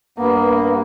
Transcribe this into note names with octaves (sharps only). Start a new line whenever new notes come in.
G2 A#3 B3